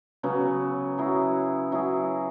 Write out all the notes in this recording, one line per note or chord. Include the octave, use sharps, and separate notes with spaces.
C#3 F#3 B3
F#3 E4 G#4
F#3 E4 G#4